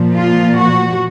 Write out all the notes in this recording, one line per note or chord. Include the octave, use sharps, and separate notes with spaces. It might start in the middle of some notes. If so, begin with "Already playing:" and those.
Already playing: A#2 F3
F4
F#4